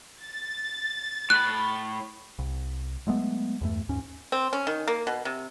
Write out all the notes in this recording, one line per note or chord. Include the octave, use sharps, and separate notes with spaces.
A6
A2 B5 F#6
C2
F#3 G#3 A3 B3
E2 G2 A3
D#2 G#2 C#4
C4
C#4
D#3
A#3
B2
C3